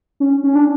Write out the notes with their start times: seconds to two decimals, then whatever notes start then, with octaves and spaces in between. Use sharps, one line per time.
0.20 C#4
0.44 C#4
0.55 D4